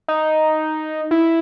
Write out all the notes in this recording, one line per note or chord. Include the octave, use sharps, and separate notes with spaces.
D#4
E4